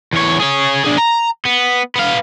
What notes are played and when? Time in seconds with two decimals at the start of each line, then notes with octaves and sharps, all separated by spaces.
0.13 E2 C#5
0.39 G#4 C#5
0.85 D4 G#4
0.98 A#5
1.45 B3
1.96 B3 F5